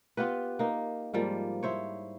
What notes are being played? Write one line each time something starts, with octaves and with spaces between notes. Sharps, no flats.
B3 F4 G4 B4
A#3 D#4
G#2 F3 G3 A#3
E4 C5 C#5